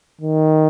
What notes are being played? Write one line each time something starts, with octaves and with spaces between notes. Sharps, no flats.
D#3